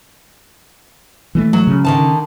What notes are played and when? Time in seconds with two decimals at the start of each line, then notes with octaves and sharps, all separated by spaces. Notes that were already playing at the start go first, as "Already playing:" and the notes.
1.35 E3 G#3 A3
1.53 F#3
1.67 C#3
1.85 D3 D#3 A5